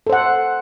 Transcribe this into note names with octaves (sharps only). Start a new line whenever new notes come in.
A4 C5 F#5